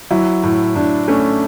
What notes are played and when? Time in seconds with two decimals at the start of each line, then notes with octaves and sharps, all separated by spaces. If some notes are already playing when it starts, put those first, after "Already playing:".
0.11 F#3 E4
0.43 A2
0.75 A2 D4
1.08 A3 C#4